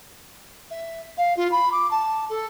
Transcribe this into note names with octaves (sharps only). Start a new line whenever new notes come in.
E5
F5
F4
B5
D6
A5
A4